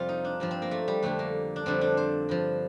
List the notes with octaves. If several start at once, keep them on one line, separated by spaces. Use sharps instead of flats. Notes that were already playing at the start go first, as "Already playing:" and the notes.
Already playing: F2 C3 G3 F4
D#4
D4
G2 F3 C4
C4
A#3
A3
G3
F2 D3 G3 A3
A#3
D4
F2 D3 G3 C4
D4
C5
G2 F3